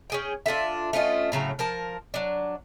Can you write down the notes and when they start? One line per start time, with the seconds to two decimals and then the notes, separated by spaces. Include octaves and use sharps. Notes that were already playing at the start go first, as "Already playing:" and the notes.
0.10 C#4 G#4 G5
0.46 D4 F4 A4 E5
0.93 A3 C#4 F4 D#5
1.32 A2 C#3 F#3 A#5
1.59 F3 A#4 A5
2.14 F#3 D4